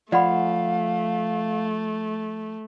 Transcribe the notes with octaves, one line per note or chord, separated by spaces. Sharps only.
F3 A3 D5 F5 F#5 B5